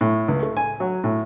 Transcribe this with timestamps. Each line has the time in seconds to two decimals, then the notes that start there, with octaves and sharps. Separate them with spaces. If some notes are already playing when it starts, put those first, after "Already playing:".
0.01 A2
0.29 C#2
0.43 A3
0.57 G#5
0.80 F#3
1.04 A2